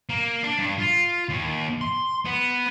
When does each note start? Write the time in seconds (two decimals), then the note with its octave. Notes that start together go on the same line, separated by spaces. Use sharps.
0.09 A#3
0.43 D4
0.59 G2
0.78 F4
1.29 D#2
1.81 C6
2.26 B3